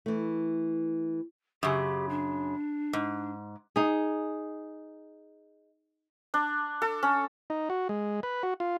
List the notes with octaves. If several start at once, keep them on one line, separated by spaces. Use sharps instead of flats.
E3 A3
F#2 C#3 G4
D4
G#2
D#4 G#4
D4
A4
C#4
D#4
F#4
G#3
B4
F#4
F4